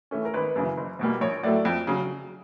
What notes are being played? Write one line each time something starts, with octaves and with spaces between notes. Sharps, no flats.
E3 A3 C#4
A#4
G#1 B4
F#2 C#3 E3
F#1
E2 B2 G3 A#3
A#1 C#5
A2 F#3 A3 D5
F2
C#3 F#3